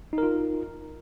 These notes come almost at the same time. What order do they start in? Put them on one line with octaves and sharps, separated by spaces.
D#4 A#4 F4